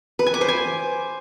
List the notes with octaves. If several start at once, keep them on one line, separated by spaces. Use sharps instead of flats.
B4
G#5
D6
C5
G#5